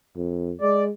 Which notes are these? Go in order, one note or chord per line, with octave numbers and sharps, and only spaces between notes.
F2
G#3 D5